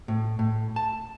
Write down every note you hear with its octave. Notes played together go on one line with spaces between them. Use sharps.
A2
A2
A5